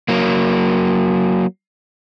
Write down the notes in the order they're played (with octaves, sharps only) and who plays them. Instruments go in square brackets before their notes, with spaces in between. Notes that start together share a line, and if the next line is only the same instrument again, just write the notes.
[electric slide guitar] F#3 A#3